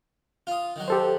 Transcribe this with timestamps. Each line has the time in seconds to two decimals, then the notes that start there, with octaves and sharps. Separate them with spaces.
0.47 F4 D#6
0.76 D#3 F#3
0.88 G4 A4 C5